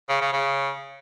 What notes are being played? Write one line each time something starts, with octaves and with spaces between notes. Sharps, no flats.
C#3
C#3
C#3